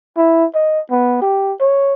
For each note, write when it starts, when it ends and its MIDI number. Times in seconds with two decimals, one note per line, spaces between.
0.17 0.45 64
0.55 0.80 75
0.91 1.19 59
1.22 1.53 67
1.61 1.94 73